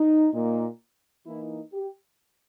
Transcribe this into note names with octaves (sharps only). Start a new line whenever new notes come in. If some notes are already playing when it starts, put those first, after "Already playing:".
Already playing: D#4
A#2 A#3 D#4
E3 A#3 D#4 E4
G4